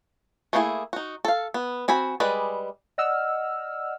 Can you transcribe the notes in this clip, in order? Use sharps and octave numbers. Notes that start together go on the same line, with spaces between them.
A3 A#3 D4 E4 G#4
D#4 F#4
A4 F5
B3
C4 F#4 G#5 B5
G3 G#3 G#4 B4 D5
D5 D#5 F#5 E6 F6